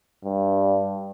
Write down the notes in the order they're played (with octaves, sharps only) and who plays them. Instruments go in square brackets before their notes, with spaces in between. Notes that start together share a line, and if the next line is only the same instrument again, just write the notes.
[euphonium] G2